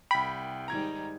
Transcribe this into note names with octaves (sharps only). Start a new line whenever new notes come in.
C2 G5 B5
G#2 D#3 G3 A#5 G#6